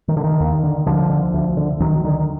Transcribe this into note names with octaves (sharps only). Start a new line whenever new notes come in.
D#3
D3
D#3
D#2
D3
D2 D3 F3
D3
D2
D3
D2 D#3 F#3
D3 D#3